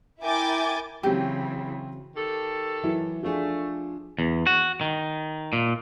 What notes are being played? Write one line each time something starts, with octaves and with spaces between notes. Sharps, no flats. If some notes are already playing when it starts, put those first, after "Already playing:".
E4 A#4 G5 G#5 D6 A6
C#3 E3 F#3 C4 G4
D#3 G4 A4
E3 F#3 E4
F3 A3 D4 G#4
E2
F#4
D#3
A#2